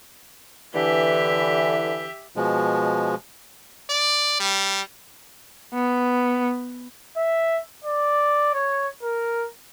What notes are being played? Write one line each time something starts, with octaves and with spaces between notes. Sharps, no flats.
D3 E3 G4 E5
B2 F3 G#3
D5
G3
B3
E5
D5
C#5
A#4